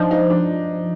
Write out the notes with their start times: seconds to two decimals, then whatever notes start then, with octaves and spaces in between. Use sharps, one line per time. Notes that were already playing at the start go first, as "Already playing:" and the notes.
Already playing: F3 D4 D#4
0.11 D#4
0.30 D4